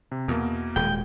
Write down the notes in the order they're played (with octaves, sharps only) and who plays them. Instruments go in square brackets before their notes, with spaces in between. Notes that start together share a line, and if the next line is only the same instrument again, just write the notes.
[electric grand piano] C3
[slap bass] E2 [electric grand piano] B2 A#3
[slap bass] D#1 G#3 [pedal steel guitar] G5